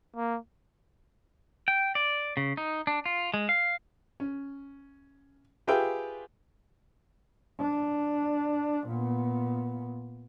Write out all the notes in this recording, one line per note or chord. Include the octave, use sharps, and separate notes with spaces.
A#3
G5
D5
C#3
D#4
D4
F4
G#3
F5
C#4
F4 G4 G#4 B4 E5 G5
D4
A#2 B3